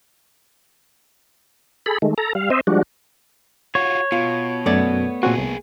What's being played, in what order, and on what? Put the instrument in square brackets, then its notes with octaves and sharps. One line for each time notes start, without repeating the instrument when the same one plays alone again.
[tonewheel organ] G#4 A4 B5
D#3 G#3 A3
A4 A#5
G3 F5
C4 C5 D#5 E5
F3 G3 G#3 D4 F#4
[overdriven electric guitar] F4 F#4 [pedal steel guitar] C#5
[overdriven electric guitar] B2 [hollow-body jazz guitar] F4
[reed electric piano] F#2 G#6 [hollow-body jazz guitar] A3 B3 D5
[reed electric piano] A#2 C4 F#4 [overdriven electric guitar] A#3 G#4
[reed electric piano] C2